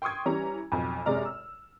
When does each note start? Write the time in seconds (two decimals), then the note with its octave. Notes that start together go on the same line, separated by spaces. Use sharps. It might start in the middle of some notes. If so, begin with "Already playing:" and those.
0.02 G5 C6 C#6 D#6 G#6
0.25 E3 G3 C#4 A#5
0.72 B1 F2
1.06 F#2 C3 G#3 D5 A#5 F6
1.25 E6